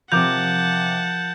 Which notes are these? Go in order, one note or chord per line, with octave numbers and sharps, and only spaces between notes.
C3 F3 A#4 F#5 A5 D6 G6 F7